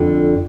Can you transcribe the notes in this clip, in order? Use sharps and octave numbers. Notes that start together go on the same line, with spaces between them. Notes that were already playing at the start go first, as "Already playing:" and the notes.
Already playing: F2 D3